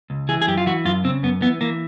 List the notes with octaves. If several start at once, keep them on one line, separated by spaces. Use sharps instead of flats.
C#2
E3 G#4
G#4
F#2 G4
F4
E3 F#4
F#2 F4
C#3 C4
F#2 B3
E3 B3
E3 A#3